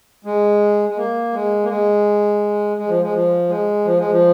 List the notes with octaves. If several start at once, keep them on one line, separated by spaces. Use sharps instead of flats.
G#3
G#3
A#3
G#3
A#3
G#3
G#3
F3
G#3
F3
G#3
F3
G#3
F3